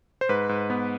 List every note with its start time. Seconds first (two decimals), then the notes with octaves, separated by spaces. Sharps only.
0.21 C5
0.29 G#2 B4
0.49 G#2
0.70 B3